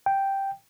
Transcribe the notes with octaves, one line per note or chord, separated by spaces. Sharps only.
G5